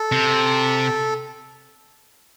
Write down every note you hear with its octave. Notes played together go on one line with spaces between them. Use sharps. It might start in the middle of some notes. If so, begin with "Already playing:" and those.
Already playing: A4
C3